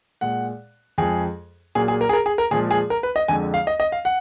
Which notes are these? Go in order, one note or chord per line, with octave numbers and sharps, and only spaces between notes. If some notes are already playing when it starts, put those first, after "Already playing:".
A#2 G#3 F#5
F2 F3 G#3 G#4
A#2 F#3 A#3 G#4
G#4
A#4
G#4
A#4
G#4
A#4
A#2 F3 G#3 G#4
G#4
A#4
B4
D#5
F2 D3 G#3 G#5
F5
D#5
D#5
F5
F#5